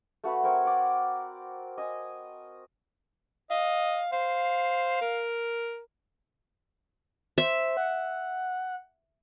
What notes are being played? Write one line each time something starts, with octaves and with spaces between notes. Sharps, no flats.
A3 F#4 B4 B5
C4 A#4 C#5
D5 F#5
D#5 G#5
D#5 F5
C5 F5
A#4
C5 E5
F#5